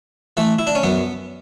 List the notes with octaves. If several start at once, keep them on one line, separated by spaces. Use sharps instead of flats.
E3 A3
E4
D4
C#4
F#2 B3